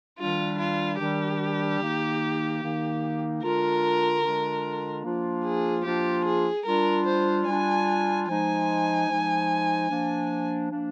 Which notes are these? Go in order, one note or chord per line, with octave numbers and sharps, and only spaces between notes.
D#3 G3 D4 F4
F4
D#3 G3 D4 G4
D#3 A#3 D#4
D#3 A#3 D#4
D3 G#3 D4 F4 A#4
D3 G#3 D4 F4
F3 A#3 D4 F4
G#4
F3 A#3 D4 F4 G4
G#4
G3 D4 F4 A#4
C5
G3 D4 F4 G#5
F3 G#3 D#4 G#5
F3 G#3 D#4
F3 A#3 D4
F3 A#3 D4